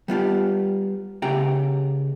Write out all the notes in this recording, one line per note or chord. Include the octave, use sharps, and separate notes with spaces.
G3 B3 F4 G4
C#2 C#3 G4 F#5 G5 A#5